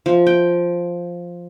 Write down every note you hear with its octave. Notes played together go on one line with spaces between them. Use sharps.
F3
G5